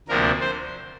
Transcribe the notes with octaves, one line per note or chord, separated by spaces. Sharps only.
D2 C3 F3 A#3 D4 A#4
C5